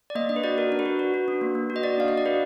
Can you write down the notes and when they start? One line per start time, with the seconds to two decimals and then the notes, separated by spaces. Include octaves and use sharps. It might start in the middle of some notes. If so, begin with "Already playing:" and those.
0.10 D5
0.15 A#3 D#5
0.29 D4 D#5
0.36 B4
0.44 F#4 D5
0.58 F#4 A#4
0.72 D4
0.79 B4
0.86 F#4
0.99 F#4
1.14 F#4
1.28 D4
1.41 A#3
1.55 A#3
1.70 F#4
1.76 D#5
1.83 F#4 D5
1.98 D4 F5
2.08 D#5
2.12 D4
2.18 D5
2.26 F#4 B4